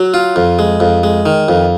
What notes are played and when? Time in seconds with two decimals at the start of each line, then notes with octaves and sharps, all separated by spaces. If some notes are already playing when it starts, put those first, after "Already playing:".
Already playing: F#3
0.14 F4
0.36 F2
0.59 G#3
0.80 F2
1.03 G#3
1.26 D#3
1.48 F2